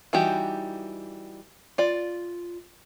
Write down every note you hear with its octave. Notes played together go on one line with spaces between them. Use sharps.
E3 G3 D#4 F#4 G4
F4 D5